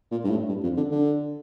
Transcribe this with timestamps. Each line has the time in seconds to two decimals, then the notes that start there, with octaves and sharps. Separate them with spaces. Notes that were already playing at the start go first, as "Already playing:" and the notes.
0.12 A#2
0.24 G2
0.30 A2
0.49 G2
0.63 F2
0.77 D3
0.91 D3